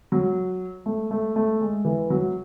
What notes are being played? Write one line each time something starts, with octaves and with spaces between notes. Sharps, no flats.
F#3
A3
A3
A3
G#3
E3
F#3